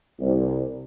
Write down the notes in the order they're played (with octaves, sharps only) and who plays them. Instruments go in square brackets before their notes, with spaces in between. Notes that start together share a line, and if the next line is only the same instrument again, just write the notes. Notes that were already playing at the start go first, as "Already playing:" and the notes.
[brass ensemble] C2